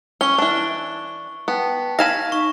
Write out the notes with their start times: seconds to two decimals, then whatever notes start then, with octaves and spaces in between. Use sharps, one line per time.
0.21 C#4 C#6 G7
0.38 E3 D4
1.48 B3 G5 A5
1.99 F5 G#5 B5 A#6 E7
2.32 D#4 C#6